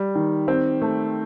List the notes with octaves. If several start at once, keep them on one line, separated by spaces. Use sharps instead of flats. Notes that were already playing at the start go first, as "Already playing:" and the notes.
Already playing: G3
D#3
C4
A3